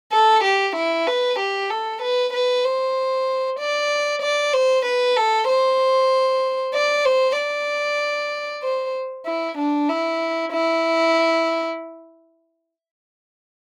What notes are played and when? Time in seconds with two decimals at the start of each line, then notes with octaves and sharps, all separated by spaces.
0.12 A4
0.44 G4
0.76 E4
1.07 B4
1.39 G4
1.70 A4
2.01 B4
2.33 B4
2.65 C5
3.59 D5
4.22 D5
4.53 C5
4.85 B4
5.16 A4
5.48 C5
6.73 D5
7.05 C5
7.37 D5
8.63 C5
9.25 E4
9.57 D4
9.89 E4
10.52 E4